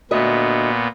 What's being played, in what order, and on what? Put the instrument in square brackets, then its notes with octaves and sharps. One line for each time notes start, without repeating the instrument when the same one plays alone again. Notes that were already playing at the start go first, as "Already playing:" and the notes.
[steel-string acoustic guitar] D2 D#5 E5 [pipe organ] A#2 B3